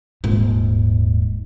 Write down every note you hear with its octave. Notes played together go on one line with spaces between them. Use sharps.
D#1 G#2